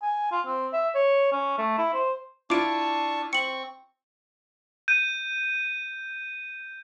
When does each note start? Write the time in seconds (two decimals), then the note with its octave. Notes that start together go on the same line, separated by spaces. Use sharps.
0.02 G#5
0.31 F4
0.47 C4
0.73 E5
0.95 C#5
1.32 C#4
1.58 A3
1.78 E4
1.94 C5
2.50 D4 E4 F4 A5 C#6 D6 D7
3.33 C4 C#6 C#7 F#7
4.88 G6 D#7